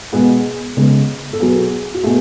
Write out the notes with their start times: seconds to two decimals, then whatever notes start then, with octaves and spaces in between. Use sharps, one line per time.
0.13 B2 G#3 B3 G#4
0.77 C#3 G#3 B3
1.33 A4
1.40 B2 F#3 B3 G#4
1.94 F#4
2.03 B2 A3 G#4